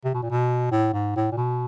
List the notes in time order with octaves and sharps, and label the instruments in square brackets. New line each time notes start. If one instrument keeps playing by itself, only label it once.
[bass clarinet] C3
B2
A#2
B2
A2
G#2
A2
A#2
B2